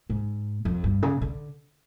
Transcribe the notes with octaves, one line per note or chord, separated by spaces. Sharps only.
G#2
F2
G2
C#3
D3